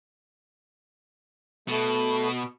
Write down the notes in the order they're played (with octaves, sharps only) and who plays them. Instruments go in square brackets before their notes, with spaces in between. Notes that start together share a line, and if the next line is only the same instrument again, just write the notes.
[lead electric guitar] B2 [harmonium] A3